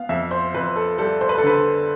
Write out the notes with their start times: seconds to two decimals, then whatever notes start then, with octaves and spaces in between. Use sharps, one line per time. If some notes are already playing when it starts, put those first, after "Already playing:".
Already playing: B3 F5
0.09 F2 E5
0.31 C5
0.54 F2 B4
0.76 A4
0.98 G3 A4
1.21 C5
1.29 B4
1.38 A4
1.43 D3 B4